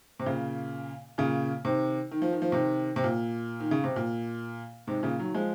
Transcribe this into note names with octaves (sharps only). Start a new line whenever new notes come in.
C3
A#2 C#3
A#2 C#3
C3 D#3
D#3
F3
D#3
F3
C3 D#3
C3
A#2
D#3
C#3
C3
A#2
G#2 C3
A#2 C#3
D#3 F#3
F3 G#3